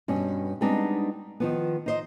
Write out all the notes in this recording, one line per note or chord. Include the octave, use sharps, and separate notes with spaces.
G2 B2 C#4
G3 G#3 B3 C4 D4 D#4
D#3 F3 B3
D#4 C5 D#5